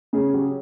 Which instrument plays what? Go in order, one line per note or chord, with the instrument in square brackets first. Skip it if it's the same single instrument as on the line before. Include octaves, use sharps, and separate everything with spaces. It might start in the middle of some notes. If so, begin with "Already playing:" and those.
[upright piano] C#3 G#4
F#3 G4